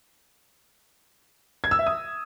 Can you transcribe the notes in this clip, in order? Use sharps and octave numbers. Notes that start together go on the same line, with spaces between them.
G#6
E6
E5
D#6